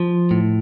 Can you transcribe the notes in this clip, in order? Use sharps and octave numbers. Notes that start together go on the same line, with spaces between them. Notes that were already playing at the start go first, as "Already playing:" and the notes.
Already playing: F3
A2